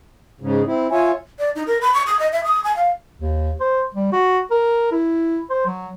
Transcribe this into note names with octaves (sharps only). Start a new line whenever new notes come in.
G#2 C#3
C4 E4
F4 C#5 E5 G#5
D5
D#4
A#4
B5
C#6
D#6
D#5
E5
D#6
G#5
F5
D#2
C5
G3
F#4
A#4
E4
C5
F#3